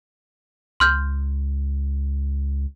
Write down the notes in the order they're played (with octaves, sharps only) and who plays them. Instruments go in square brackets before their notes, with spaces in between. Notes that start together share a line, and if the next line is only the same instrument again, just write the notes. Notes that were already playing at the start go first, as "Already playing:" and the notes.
[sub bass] C#2 [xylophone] C6 F6 G6